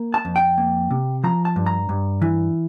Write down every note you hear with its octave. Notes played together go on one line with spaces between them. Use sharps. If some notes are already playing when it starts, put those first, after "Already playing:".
Already playing: A#3
A5
F2
G5
A#3
C3
F3 A#5
A5
G2
A#5
G2
E3